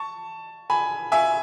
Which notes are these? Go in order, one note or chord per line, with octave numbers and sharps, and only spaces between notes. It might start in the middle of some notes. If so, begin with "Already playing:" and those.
Already playing: A5 C#6
G#5 B5
E5 G#5